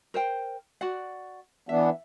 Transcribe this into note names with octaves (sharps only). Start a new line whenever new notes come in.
A#4 C5 G5
F#4 D5 F#5
E3 B3 D4 E5